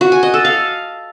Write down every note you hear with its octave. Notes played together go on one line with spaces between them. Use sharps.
F#4
G#5
D#5
A4
F5